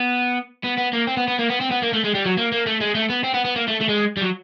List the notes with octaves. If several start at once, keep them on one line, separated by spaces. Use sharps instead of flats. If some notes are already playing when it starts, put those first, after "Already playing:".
Already playing: B3
B3
B3
A#3
C4
B3
B3
A#3
B3
C4
B3
A#3
A3
G#3
G3
F#3
A#3
A#3
A3
G#3
A3
B3
C4
B3
B3
A#3
A3
A3
G#3
G3
F#3